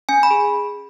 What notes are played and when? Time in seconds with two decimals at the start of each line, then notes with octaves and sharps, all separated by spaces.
0.09 C#4 G#5
0.23 B5
0.31 G#4